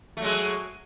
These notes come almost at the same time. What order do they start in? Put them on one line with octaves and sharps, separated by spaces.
A3 F#3 G#3